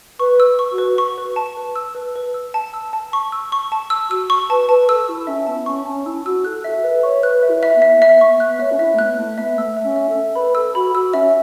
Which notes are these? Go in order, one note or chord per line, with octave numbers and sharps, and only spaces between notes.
B4 C#6
E6
C#6
F#4
B4
C#6
B4
A5
B4
E6
B4
B4
E6
A5
E6
A5
C#6
E6
C#6
A5
E6
F#4 E6
C#6
B4 A5
B4 A5
A4 E6
E4 C#6
C#4 E5
B3 A5
C#4 C#6
C#4 A5
E4 E6
F#4 E6
A4 F#6
A4 E5
B4 E5
C#5 C#6
B4 F#6
E5
E4
E5
B3
E5
B3 E5
B3 C#6
B3 F#6
C#5 E5
C#4
E4 E5
A3
B3 F#6
A3 F#6
B3 E5
A3 E6
E5
C#4
E5
A4
E5
B4 B5
A4 E6
F#4 B5
F#4 E6
C#4 E5